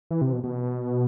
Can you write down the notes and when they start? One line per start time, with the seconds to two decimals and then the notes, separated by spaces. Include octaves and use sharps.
0.11 E3
0.21 C3
0.33 B2
0.44 B2